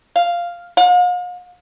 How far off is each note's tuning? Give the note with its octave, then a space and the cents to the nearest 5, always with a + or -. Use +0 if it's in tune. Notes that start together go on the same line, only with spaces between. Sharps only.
F5 -5
F5 +45